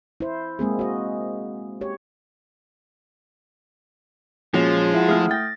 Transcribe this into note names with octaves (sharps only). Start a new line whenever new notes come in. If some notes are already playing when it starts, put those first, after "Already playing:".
E4 C5
G#3 A#3 C4 G#4
F#4 D#5
G4 C#5
A#2 F3 G#3 C#4 F#4
E4 E5 F#5
A3 C4 F4 G#4 D#6 F6
G5 A6 A#6